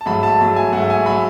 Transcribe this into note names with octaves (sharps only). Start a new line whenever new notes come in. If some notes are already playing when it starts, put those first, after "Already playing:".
A5
G#2 F#3 A3 B5
A5
G#2 F#3 A3
G#5
G#2 F#3 A3 F#5
G#5
F#3 A3 B5